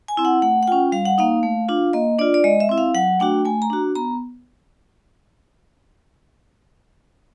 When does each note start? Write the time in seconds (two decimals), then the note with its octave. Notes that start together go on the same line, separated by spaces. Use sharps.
0.08 G#5
0.17 C4 E4
0.25 F#5
0.42 A3 F#5
0.63 F#5
0.67 C#4 F4 G5
0.92 G3 F5
1.05 F#5
1.18 A#3 D#4 F5
1.43 A3
1.69 D4 F4
1.93 A#3 D#5
2.19 D4 F4 D5
2.34 D5
2.44 G#3 D#5
2.60 E5
2.69 C4 E4
2.78 F5
2.94 F#3 F#5
3.20 A3 D4 F#4 G5
3.45 A3 G#5
3.62 A#5
3.70 D4 F#4
3.95 B3 A#5